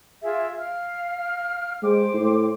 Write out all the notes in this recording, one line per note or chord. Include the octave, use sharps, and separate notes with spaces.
F4 G#4 E5
F5 F6
G#3 C5 G5 D6
A2